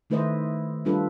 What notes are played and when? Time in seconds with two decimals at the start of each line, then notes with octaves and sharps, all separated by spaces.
0.10 D#3 A3 E4 B4 C5 D#5
0.85 G3 D4 F4 A4 B4